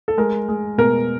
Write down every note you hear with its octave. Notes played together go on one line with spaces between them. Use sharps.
A4
G#3 A#4
G#3
B2 A#4